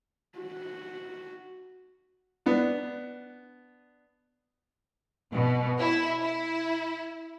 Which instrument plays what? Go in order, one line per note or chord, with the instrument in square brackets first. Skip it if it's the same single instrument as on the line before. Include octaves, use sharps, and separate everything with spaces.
[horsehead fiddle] F#4
[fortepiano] B3 D4
[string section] B2
E4
E4